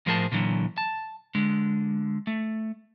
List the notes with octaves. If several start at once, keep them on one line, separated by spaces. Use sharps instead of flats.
A2 F3 G#4 A#4 C5 A5
A#2 D3 E3 F#3
A5
D3 G#3
A3